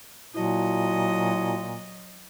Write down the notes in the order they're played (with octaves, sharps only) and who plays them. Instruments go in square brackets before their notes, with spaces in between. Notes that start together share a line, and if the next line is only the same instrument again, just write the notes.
[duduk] A#2 [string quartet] F#3 D#5 [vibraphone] E4 F#4 A5